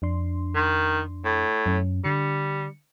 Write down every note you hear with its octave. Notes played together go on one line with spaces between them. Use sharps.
F2 D4 C6
D#3
A2
F#2 C#4
D3 G3 C#7